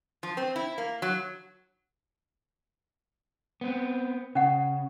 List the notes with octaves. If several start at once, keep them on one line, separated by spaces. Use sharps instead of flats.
F3
C4
E4
A#3
F#3
B3 C4
C#3 C#4 F#5